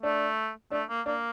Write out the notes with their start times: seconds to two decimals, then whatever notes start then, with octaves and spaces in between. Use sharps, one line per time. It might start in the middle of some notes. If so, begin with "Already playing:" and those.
0.03 A3 D4
0.71 A3 D4
0.89 A#3
1.06 A#3 D4